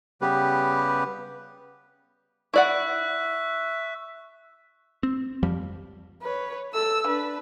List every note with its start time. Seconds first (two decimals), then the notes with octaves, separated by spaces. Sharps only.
0.21 C#3 G3 B3 G4 B4
2.54 E4 D5 E5 F#5 C#6 F#6
5.03 C4
5.43 F2 F3 G3
6.22 B4 C#5
6.73 A4 E6
7.07 D4 B4